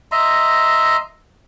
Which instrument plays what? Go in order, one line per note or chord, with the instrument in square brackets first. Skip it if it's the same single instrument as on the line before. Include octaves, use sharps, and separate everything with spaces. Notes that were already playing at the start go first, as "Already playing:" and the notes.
[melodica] D#5 E5 A#5 C6